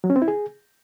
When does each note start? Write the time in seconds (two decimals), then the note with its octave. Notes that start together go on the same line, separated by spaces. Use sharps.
0.04 F#3
0.10 C#4
0.16 C4
0.22 E4
0.28 G#4